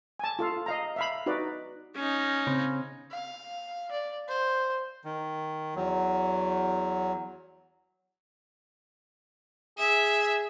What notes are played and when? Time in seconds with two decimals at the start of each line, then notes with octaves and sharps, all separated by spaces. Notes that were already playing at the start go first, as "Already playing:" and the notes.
0.19 G#5 A5
0.39 F4 A4 F5
0.66 D#5 F5 A#5
0.96 E5 F5 B5
1.26 D#4 F#4 B4 D5
1.96 C#4 D#4
2.47 C#3 C4
3.11 F5
3.92 D5
4.29 C5
5.05 D#3
5.75 E2 F#3
9.79 G#4 E5